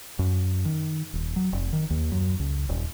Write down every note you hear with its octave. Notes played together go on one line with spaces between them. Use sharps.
F#2
D#3
D#1
F#3
F1
D#3
D#2
F#2
C#2
D#1